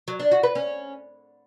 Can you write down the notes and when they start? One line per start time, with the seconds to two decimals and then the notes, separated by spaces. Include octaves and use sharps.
0.08 F#3
0.20 D4
0.31 F#4
0.43 B4
0.55 C#4